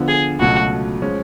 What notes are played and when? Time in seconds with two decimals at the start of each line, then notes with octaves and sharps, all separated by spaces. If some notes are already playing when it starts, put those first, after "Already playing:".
Already playing: D3 F3 B3 F4
0.08 G#4
0.39 C#2 B2 F#3 A3 F4 F#4
1.02 F3 G#3 C#4